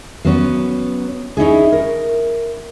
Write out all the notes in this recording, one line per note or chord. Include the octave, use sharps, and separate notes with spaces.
F#3 B3 C#4
C#4 D#4 E4 G#4
A#4